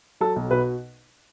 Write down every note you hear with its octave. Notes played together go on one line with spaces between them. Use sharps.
F#3 A4
B1
B2 B4